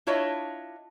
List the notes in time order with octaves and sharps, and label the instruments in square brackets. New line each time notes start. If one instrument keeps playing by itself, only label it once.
[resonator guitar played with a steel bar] D4 E4 F4 C#5 D#5 E5